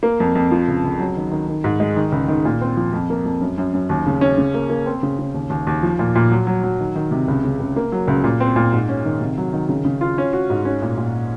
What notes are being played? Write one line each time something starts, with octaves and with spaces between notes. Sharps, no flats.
A#3
F2
F2
F3
C#2
C#2
F#3
D#3
D#3
D#3
G#2
G#3
D#3
C#2
D#3
A#2
C4
F3
F2
A#3
F2
F#2
F#2
F#2
D#2
C#3
C#4
C#3
A#3
A#3
C4
C#3
C#3
D#2
D#2
D#2
F3
A#2
A#2
F#3
F#3
F#3
D#3
D#3
C3
C#2
C#3
C#2
A#3
F#3
C#2
A#2
C4
A#2
G#2
C#4
D#3
C3
F#3
D#3
C#3
C#3
F4
C#4
F#4
G#2
C#4
A#2
A#2